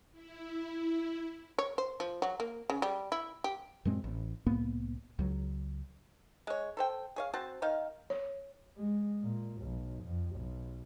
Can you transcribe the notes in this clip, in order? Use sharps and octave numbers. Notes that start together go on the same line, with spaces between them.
E4
C#5
C5
F3
F#3
A#3
C#3
G3
E4
G4
F#2 A#2 G#3 C4
A1
C2 A2 A#3 B3
C#2 F#3
G#3 C#5
A4 C5 G5
G#4 C#5 F5
C4 F#4 C5 A5
D#3 D#4 F5
C#5
G#3
A#2
B1
F2
B1